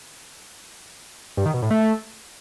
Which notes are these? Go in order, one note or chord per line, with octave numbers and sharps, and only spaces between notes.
G2
D#3
B2
A2
A3